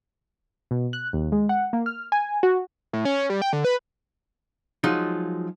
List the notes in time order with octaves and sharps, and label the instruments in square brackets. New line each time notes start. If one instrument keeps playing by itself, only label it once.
[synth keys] B2
F#6
D#2
G#3
F#5
A#3
F6
G#5
F#4
[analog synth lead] A2
C#4
G3
G5
D3
B4
[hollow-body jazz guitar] F3 F#3 G#3 D#4 F4